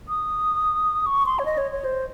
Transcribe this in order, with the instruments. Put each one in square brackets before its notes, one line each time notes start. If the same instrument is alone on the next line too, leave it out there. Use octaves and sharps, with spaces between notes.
[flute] D#6
C#6
C6
C#5
D#5
C#5
C#5
C5